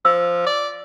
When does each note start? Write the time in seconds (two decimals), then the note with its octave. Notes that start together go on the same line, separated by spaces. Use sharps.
0.05 F3 E6
0.47 D5